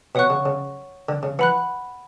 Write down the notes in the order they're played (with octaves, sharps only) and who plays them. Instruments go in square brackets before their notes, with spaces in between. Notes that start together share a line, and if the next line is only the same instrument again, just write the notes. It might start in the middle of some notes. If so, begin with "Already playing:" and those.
[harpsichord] B2 [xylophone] C#5 F#5 C#6 F#6
[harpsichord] C#3
C#3
D3
C#3
[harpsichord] E3 [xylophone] F#5 B5 F#6